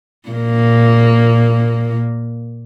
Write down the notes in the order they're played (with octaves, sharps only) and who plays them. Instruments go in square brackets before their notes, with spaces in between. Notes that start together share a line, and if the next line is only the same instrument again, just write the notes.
[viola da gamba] A#2 A#3